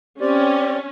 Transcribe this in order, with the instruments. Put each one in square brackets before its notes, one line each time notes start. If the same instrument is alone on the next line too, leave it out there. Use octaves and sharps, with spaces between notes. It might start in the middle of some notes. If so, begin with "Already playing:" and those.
[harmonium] C4 G4 D5 [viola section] C#4